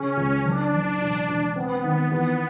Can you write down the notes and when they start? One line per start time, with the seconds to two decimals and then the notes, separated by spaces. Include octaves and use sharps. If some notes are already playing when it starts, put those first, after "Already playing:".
Already playing: C#3 C#4
0.17 C#2
0.45 F#1 D4
0.74 F#1
1.01 E1
1.28 E1
1.56 B3 C4
1.84 D#3
2.11 E2 B3